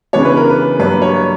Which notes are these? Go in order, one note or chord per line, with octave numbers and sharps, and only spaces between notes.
C#3 E3 B3 D4 C#5
B4
A#4
B4
G2 F#3 A#3 B4
C#5